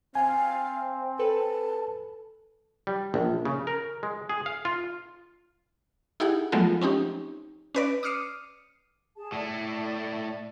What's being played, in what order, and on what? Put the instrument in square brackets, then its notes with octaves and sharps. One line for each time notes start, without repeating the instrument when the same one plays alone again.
[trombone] C4 [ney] F5 [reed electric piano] G#5
[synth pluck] A4 B4 [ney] A5
[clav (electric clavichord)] G3
A#1
C#3
A#4
G#3
G#4
F5
F4
[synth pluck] D#4 E4 G4 G#4 F#5
F3 F#3 G#3 A3 B3 F4
C4 C#4 D#4 G4
C#4 B4 D5
D6 D#6 F6 C7 C#7 D#7
[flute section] G#4 A5
[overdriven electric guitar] A2 A3 [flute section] D5